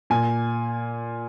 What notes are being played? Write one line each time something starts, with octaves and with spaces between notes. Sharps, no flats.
A#2 G#5